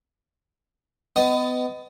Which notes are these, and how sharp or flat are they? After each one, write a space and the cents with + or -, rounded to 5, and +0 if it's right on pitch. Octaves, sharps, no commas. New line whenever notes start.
B3 +30 D#5 +0